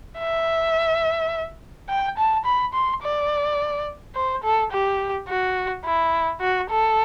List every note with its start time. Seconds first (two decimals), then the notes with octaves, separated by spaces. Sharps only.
0.19 E5
1.89 G5
2.17 A5
2.45 B5
2.74 C6
3.03 D5
4.15 C5
4.43 A4
4.72 G4
5.28 F#4
5.85 E4
6.41 F#4
6.70 A4